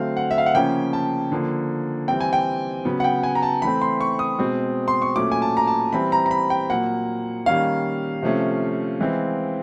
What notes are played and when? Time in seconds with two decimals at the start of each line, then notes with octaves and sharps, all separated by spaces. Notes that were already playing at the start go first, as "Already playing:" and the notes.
Already playing: D3 F#3 A3 C4 F5
0.17 F#5
0.31 E5
0.38 F5
0.46 F#5
0.54 C#3 F3 A#3 C#4 G5
0.93 A5
1.32 D3 F3 A#3
2.08 E3 G3 C4 G5
2.21 G#5
2.33 G5
2.85 C#3 F#3 B3
3.00 F#5
3.04 G5
3.23 G#5
3.35 A#5
3.43 A5
3.62 E3 A3 C4 B5
3.82 C6
4.01 C#6
4.19 D#6
4.39 B2 G#3 C4
4.88 C6
5.02 C#6
5.16 A#2 F#3 A3 C#4 D6
5.32 G#5
5.42 A5
5.57 A#5
5.67 A5
5.93 E3 G3 C4 B5
6.12 A#5
6.26 A#5
6.31 B5
6.50 G5
6.70 A#2 F#3 A#3 F#5
7.46 D#3 G3 A#3 C#4 F5
8.23 C3 F3 A3 C#4
9.01 E3 G#3 C4